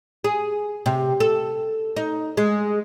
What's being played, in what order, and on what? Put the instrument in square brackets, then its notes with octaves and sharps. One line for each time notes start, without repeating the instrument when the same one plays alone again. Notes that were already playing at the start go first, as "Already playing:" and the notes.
[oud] G#4
C3
A4
D#4
G#3